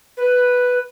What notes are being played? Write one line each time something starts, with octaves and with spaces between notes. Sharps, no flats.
B4